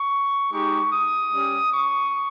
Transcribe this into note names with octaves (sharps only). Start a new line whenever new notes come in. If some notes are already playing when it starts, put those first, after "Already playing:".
Already playing: C#6
G#3 D#4 G4 C#6
D#6
G3 C#4 G4
C#6